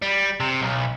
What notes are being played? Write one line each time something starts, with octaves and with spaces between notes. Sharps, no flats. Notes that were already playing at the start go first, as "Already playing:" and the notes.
G3
C3
B1